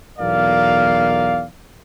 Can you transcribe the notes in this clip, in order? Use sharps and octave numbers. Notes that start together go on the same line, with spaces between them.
B1 E2 A#4 D5 F5